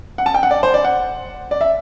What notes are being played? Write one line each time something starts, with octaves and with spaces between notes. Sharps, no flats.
F#5
A5
G5
F#5
D5
C5
D5
F#5
D5
E5